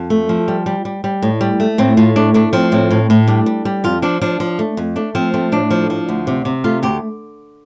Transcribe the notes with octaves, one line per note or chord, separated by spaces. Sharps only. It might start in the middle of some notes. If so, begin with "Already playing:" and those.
Already playing: F2 F4
A3
F3
G3
G3
G3
G3
A2
G3
A3
A2 C4
A2 F4
A3 D4
A3 D4
F3 C4
A2 C4
A2
A2
G3 D4
G3
G3
F2 F4
F3 D4
F3 D4
F3
A3
F2
A3 D4
F3 C4
A3 C4
A2 D4
F3
F3
D2
C3
C3
A3 F4
D2 G4